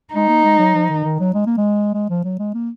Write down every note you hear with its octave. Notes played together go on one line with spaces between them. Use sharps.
G#3 D#4
A#3
G#3
F#3
F3
D#3
D#3
F#3
G#3
A#3
G#3
G#3
F3
F#3
G#3
A#3